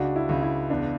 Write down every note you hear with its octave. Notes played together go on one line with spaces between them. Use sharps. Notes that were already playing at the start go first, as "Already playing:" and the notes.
Already playing: C#2 D4 F#4
E4
C#2
E4
E2 D4